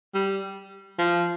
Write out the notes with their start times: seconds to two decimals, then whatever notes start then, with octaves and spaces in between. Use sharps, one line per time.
0.14 G3
0.99 F3